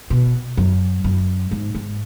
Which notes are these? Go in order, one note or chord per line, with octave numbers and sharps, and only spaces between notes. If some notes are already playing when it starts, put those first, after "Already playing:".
B2
F#2
F#2
G#2
G#2